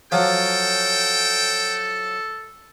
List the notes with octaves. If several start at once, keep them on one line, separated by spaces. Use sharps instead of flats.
F3 F#3 A4 G5